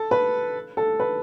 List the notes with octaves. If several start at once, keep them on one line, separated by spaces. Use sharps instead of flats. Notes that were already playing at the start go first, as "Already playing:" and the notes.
Already playing: A4
B4
A4
B4